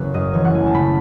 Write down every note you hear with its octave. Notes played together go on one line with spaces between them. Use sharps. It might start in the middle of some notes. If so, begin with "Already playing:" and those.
Already playing: F#1 C#3 B4 C#5
F#2 D#5
E3 C#5
F#5
A3 G#5
A5
C#3 B5